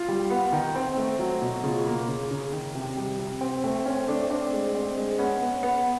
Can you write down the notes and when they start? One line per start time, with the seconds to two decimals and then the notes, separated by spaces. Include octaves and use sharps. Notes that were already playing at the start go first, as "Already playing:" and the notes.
Already playing: F4
0.08 G3
0.30 B3
0.52 D#3
0.75 C4
0.97 A3
1.19 F#3
1.42 B2
1.64 C#3 F4
1.86 A#3
2.08 C#3
2.31 C#3
2.53 D#3
2.75 C3
2.97 G3
3.19 C3
3.41 C4
3.64 A3 C4
3.86 C4 C#4
4.08 A3 D4
4.30 C4 D4
4.53 G#3
4.75 C4
4.97 G#3
5.19 B3 C#4
5.41 B3
5.63 B3